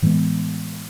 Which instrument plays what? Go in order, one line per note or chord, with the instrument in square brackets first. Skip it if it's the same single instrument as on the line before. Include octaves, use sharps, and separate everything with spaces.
[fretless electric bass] A2 E3 G#3 B3